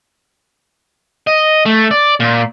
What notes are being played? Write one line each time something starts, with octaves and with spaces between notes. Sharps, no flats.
D#5
A3
D5
A#2